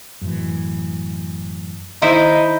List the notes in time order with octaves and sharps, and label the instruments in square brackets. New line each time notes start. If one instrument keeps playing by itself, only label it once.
[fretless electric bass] F#2 A2 E3
[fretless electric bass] D#3 [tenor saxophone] D#4 [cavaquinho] E4 C5